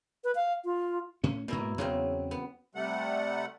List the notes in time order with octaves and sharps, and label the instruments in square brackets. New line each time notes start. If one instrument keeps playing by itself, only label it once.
[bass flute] B4
F5
F4
[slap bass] A2 C#4
[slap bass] G#2 A#3 [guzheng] B2 E4 A#5
[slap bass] E2 [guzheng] C#3 F#3 C4
[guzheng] B3
[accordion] C3 G3 A3 F#5